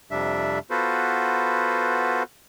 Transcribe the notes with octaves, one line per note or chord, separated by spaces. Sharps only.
F2 C3 G3 D4 E5
B3 F4 F#4 A4 B4 C5